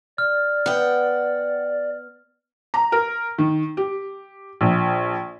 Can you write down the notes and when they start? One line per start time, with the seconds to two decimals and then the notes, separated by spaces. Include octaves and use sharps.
0.18 D5 F6
0.66 B3 F#5 G5
2.74 A#5
2.92 A#4
3.38 D#3
3.77 G4
4.61 A#1